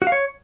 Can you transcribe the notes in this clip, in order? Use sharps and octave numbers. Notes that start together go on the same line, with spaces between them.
F#4
F5
C#5